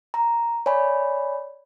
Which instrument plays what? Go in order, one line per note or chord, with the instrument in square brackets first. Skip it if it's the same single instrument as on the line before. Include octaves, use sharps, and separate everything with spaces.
[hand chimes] A#5
C#5 D5 G#5 B5